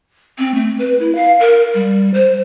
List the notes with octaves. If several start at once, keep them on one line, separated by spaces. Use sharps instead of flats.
C4
A3
B4
E4
F5
A#4
G3
C5